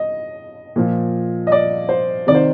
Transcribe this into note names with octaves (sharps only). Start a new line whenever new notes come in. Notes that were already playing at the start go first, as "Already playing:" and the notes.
Already playing: D#5
A#2 F3
D#5
D5
C5
C3 D#3 D5
C5